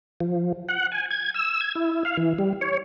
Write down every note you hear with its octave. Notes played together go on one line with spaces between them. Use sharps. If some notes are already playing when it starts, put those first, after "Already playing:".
F3
F#5
G#5
G#6
E6
G#6
E4
F5
E3
G3
C#5